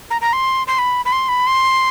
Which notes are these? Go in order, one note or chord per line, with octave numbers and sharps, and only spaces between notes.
A#5
A#5
C6
C6
B5
B5
C6
B5
C6